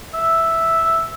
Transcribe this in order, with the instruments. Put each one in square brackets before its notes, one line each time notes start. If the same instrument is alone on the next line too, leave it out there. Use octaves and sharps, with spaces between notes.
[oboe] E5